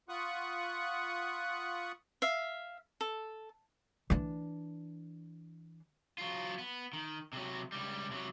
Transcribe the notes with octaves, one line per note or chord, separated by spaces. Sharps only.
F4 F#5 B5 C#6 D#6 F#6
E5 F5
A4
E3 D4
F#3 F4
B3
D#3
C3 F#3
C#2 G3
C3 F#3